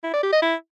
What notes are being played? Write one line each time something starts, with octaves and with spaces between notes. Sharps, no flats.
E4
D5
G4
D#5
E4